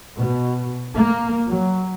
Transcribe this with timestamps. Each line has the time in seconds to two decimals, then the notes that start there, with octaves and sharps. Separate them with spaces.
0.16 B2
0.96 A#3
1.47 F#3